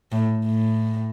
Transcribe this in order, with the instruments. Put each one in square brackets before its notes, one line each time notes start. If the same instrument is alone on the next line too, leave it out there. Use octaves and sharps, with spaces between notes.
[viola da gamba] A2
A2